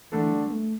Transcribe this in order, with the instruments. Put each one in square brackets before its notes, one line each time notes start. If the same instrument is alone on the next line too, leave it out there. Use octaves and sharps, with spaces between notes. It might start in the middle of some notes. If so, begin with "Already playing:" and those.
[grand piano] D3 A3 D4 A4 [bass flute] E3
[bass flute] G3
B3
A3